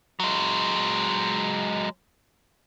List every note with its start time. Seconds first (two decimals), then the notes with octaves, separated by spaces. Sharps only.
0.20 F#3 G#3